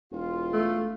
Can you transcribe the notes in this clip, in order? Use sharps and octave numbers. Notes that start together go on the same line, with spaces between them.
E1 F4
A3